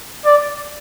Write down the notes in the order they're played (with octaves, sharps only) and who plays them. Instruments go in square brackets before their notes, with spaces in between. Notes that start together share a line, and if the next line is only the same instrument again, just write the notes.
[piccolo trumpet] D5